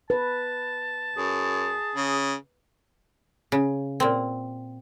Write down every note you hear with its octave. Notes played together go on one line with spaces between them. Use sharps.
B4 A5
F#2 G#4
C#3
C#3
A#2 C4